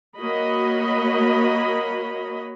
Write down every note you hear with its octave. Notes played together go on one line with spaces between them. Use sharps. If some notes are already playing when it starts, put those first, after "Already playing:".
A#3 F#4 C#5 D#5 B5